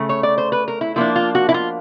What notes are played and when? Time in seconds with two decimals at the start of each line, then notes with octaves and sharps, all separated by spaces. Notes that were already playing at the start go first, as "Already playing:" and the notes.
Already playing: C#3 A3
0.09 C#5
0.23 D5
0.38 C5
0.52 B4
0.68 A#4
0.81 E4
0.96 F3 A#3 D4 E4
1.16 F4
1.35 F#4
1.49 E4
1.54 F4